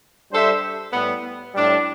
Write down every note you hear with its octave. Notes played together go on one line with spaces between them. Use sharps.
G3 D4 A4 C5 E5
A2 G3 B3
A2 G3 D4